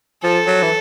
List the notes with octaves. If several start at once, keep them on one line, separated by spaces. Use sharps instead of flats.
F3 A4
F#3
E3